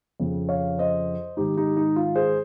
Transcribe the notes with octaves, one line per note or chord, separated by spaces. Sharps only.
F2 C#3
C#5 F5
C5 D#5
G#2 D#3 D#4 G4
D#4 G4
D#4
F4
G#4 C5